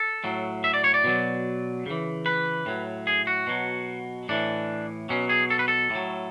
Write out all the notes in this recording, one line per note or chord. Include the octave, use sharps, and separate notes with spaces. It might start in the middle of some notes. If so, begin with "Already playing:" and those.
Already playing: A4
A2 F#3
E5
D5
C#5
D5
B2 F#3
C#3 E3
B4
A2 F#3
G#4
F#4
B2 F#3
A2 E3 D4
B2 F#3 C#4
G#4
A4
B4
A4
A2 F#3